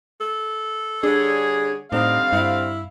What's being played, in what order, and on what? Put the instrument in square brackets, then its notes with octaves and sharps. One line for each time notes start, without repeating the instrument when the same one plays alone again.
[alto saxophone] A4
[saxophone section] D3 G3 G#4 [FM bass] D4 [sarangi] C#5
[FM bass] A2 [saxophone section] D3 G3 C4 [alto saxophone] D#4 [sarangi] F5
[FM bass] G2 [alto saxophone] E4